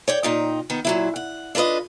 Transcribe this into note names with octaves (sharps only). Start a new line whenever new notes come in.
C#5 D5 G5
A#2 D#4 G5
D#3 B3
A#2 F#3 E4
F#5
D4 F4 A#4 B4 D#5